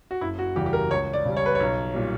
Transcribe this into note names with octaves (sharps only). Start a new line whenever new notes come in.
F#4
F#1 E4
F#4
E2 C#3 G3 G4
G4
A#4
C#2 C#5
D5
C#3 G3
C#5
B4
B1 C#5
A#2 G3